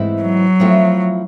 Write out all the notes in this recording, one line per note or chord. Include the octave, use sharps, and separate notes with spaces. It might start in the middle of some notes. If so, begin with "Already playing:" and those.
Already playing: G#2 E3 A3 C4 E4
F#3
F3 A3 C4 E4